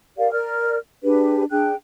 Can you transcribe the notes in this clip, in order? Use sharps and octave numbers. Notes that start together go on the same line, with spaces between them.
G4 A#4 D5 F5
A#4 D5 F6
D4 G4 G#4 B4
D4 G#4 G5 F#6